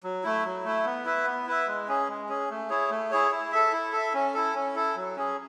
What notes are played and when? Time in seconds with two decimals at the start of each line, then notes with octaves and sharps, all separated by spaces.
0.04 F#3
0.24 A3 E4
0.45 F#3
0.65 A3 E4
0.85 B3
1.05 E4 B4 E5
1.26 B3
1.47 E4 B4 E5
1.67 G#3
1.88 C#4 G#4
2.09 G#3
2.29 C#4 G#4
2.49 A3
2.70 E4 G#4 C#5
2.90 A3
3.11 E4 G#4 C#5
3.31 E4
3.52 A4 E5
3.72 E4
3.93 A4 E5
4.14 C#4
4.34 E4 A4
4.55 C#4
4.75 E4 A4
4.96 F#3
5.16 C#4 G#4